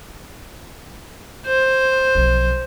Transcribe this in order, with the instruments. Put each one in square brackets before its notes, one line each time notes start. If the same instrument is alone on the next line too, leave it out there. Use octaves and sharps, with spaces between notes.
[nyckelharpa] C5
[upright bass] B1 F3